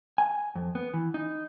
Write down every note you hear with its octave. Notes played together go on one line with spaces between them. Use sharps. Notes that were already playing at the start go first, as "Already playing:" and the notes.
G#5
F2
B3
E3
D#4